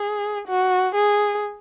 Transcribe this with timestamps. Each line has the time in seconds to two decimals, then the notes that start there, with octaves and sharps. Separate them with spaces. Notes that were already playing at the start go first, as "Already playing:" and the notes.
Already playing: G#4
0.48 F#4
0.95 G#4